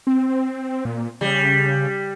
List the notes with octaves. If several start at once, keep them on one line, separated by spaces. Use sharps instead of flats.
C4
A#2
C#3 G3